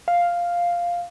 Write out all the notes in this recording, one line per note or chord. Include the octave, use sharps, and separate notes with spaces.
F5